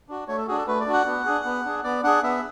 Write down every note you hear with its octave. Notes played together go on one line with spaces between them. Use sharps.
D4 F#4
A3 C#5
A4
D4 F#4 G#4
A4
A3 B4
D5
D4 F#4
F#5
B3
D4 G#4
B3
D4 G#4
B3 D5
D4 G#4 F#5
B3 E5